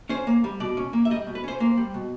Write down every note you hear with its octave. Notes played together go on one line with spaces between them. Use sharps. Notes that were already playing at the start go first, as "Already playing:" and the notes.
C#4 C5
A#3
G3
B2 D5
C#4
A#3
E5
G3 D#5
B2
B4
C#4 C5
A#3 C5
G3
B2